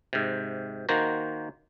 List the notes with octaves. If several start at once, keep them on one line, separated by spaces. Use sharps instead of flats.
G#2 C3
D#3 A#3 F#4 C5 A#5